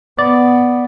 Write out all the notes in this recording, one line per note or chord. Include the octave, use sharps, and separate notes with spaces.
B3 D5